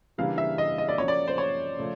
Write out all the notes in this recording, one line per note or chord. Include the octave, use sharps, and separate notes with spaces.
C#3 E3 G3 A#3 D4 F5
E5
D#5
D#5
D5
F3 A#3 C#4 F#4 C#5
D5
C5
C#5
C#3 F3 A3